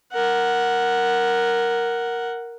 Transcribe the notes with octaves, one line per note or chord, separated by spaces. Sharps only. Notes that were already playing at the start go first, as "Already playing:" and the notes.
A#4 F#5